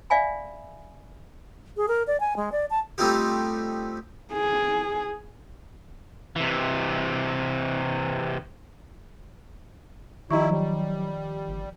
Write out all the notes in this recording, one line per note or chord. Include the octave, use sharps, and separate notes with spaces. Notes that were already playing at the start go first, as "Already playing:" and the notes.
D5 E5 F5 G#5 B5
G#4
A#4
D5
G#5
G#3
D5
A5
G3 A3 C4 D#4 F4 G4
G#4
C3 E3
D#3 F3 G3 E4 D#5 A#5 C#6
F#3 G3
G1